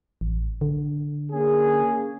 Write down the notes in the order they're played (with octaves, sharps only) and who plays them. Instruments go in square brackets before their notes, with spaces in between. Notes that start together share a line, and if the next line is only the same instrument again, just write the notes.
[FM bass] A1
D3
[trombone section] A#3 C#4 G#4